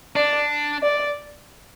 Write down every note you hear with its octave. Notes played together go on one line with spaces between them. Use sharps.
D4 D5
D5